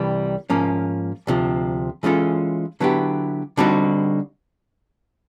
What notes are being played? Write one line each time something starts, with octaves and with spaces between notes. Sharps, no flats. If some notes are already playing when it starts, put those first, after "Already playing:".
Already playing: C2 C3 E3 G3
G#2 F3 A#3 C#4
D2 C3 F3
E3 G#3 C#4 F4 A4
D3 F#3 B3 E4 G4
D3 G3 C4 D#4 F#4